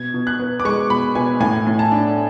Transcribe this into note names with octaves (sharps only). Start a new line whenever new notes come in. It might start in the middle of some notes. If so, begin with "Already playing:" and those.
Already playing: B2 G#6
B2
F#6
B3
D6
G#3 C#6
B2 B5
B2 G#5
A2 G#5
A2
A5
D4